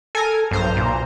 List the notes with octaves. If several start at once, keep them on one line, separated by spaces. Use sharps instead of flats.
A4 A#4 G#5
B1 G2 C5 A#5
A#2